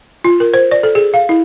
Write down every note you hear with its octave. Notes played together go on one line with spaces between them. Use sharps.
F4
A#4
C5
D5
A4
G#4
F5
E4